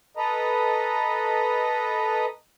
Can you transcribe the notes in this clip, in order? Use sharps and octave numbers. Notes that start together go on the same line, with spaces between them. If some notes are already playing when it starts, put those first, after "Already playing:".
A4 B4 D#5 A#5